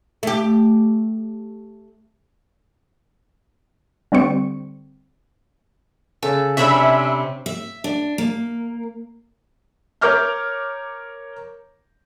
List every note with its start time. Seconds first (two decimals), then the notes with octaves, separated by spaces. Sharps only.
0.23 A3 G4
4.12 D3 G3 C4 C#6
6.23 C#3 A4 E5
6.57 C3 C#4 D4 C#5 E5 B5
7.46 E5
7.84 D4
8.18 A#3
10.01 A#4 C#5 D6 F6 G6